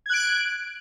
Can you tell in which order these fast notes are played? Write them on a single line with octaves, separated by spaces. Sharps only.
G#6 F#6 D7